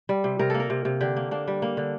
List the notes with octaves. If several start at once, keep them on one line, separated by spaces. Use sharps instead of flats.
G3
C3
C3 A#4
A#3 A4
A#4
C3
C3
D3 G4
A#3
A#3 D4
G3
A#3
D3